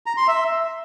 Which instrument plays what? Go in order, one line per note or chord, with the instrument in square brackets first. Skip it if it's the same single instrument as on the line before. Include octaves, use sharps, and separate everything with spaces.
[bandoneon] A#5
C6
E5